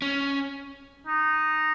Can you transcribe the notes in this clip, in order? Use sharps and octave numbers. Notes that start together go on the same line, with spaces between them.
C#4
D#4